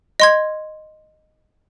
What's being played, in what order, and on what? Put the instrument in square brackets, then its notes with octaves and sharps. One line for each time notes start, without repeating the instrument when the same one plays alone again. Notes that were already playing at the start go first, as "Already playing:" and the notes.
[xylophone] D#5 C6 G#6